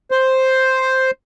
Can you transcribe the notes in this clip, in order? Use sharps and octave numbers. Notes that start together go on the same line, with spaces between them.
C5